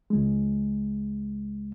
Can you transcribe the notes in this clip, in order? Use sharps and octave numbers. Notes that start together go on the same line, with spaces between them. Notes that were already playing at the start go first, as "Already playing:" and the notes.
C#2 G#3